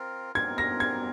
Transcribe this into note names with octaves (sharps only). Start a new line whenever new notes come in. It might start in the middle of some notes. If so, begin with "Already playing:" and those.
Already playing: C4 F4 A#4
C4 F4 A#4 G#6
A#6
G#6